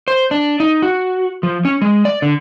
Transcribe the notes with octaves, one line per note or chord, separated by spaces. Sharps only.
C5
D4
D#4
F#4
F3
C#4
G#3
D5
D3